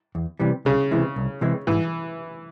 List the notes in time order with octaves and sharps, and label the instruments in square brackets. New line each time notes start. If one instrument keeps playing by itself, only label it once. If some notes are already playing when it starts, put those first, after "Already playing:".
[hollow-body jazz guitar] E2
C3 E3 G3
[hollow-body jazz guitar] C2 [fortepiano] C#3
[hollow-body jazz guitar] C3 E3 G#3 E4
C2
C3 E3 G#3 E4
[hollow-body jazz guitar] G#2 [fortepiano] E3